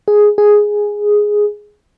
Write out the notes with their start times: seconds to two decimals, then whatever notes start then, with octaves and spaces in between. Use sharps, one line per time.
0.08 G#4
0.38 G#4